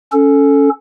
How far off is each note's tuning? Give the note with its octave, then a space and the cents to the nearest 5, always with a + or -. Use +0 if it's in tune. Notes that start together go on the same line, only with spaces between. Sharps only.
C#4 +10 A4 +0